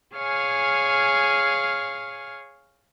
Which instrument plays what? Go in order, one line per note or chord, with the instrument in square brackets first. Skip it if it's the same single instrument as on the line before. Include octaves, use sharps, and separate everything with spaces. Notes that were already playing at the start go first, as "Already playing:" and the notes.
[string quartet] G#4 C#5 F5 G#5 F6